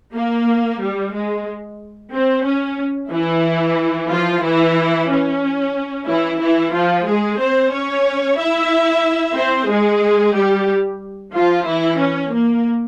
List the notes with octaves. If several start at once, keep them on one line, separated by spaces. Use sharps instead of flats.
A#3
G3
G#3
C4
C#4
E3 E4
F3 F4
E3 E4
C#4
E3 E4
E3 E4
F3 F4
G#3 G#4
C4 C5
C#4 C#5
E4 E5
C4 C5
G#3 G#4
G3 G4
F3 F4
E3 E4
C#4
A#3